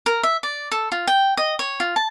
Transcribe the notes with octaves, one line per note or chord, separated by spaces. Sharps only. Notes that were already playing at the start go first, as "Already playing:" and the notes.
A#4
E5
D5
A4
F4
G5
D#5
C#5
F4
A5